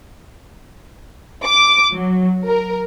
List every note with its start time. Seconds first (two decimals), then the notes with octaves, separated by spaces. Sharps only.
1.45 D6
1.94 F#3
2.45 A#4